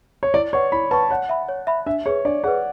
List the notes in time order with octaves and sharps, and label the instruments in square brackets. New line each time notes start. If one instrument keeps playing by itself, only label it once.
[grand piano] C#5
[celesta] E4 [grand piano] D5
[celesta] B4 F#5 C#6 [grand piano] C#5
[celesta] E4 [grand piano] B5
[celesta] B4 F#5 C#6 [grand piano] A5
[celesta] C#5 [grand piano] F#5
[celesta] E5 B5
C#5
E5 B5
[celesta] D4 [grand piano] E5
[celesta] G#4 B4 [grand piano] C#5
[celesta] D4 [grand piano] D5
[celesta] G#4 B4 [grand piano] F#5